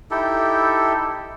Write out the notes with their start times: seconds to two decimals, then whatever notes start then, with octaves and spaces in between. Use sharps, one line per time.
0.11 D#4 E4 G4 A4